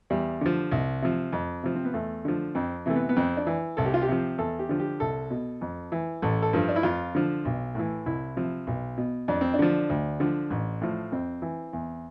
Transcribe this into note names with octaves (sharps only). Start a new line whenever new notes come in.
E2 G3
D3 F3
C2
C3 F3
F2
C3 F3
C4
B3
E2 A3
D3 F3
F2 C4
C3 E3 A3
B3
B3
F2 C4
D4
E3
C2 A4
G4
F4
G4
C3 F3
E2 A4
G4
D3 F3
G4
C2 A4
B2
F2
E3
A1 A4
A4
G2 F3
D4
E4
F2 F4
D3 F3
B1
A2 E3
C2 E4
C3 F3
B1
B2
F2 D4
C4
D4
D3 F3
D2
D3 F3
A1
A2 F3
F2 C4
E3
E2